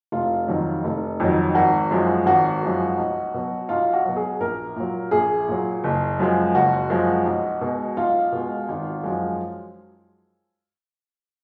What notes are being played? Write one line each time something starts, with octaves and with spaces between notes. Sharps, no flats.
F1 F4
F2 D#3 F#3
F1
F2 D#3 F#3
G#1 F#4
F#2 F3 G#3
G#1 F#4
F#2 F3 G#3
B1
B2 F#3
B1 F4
F#4
B2 F#3
G#4
A#1 A#4
A#2 F#3
A#1 G#4
A#2 F#3
F#1
F#2 F3 G#3
F#1 F#4
F#2 F3 G#3
B1
B2 G#3
B1 F4
B2 G#3
G#1
F#2 F3 G#3